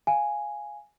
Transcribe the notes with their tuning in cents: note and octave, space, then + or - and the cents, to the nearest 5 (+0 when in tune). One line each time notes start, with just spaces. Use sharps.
F5 +0 G#5 +0